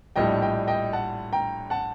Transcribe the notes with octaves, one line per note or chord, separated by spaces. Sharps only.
A#1 A2 G3 D#5 G5
D#5 G5
D#5 G5
F#5 A5
G5 A#5
F#5 A5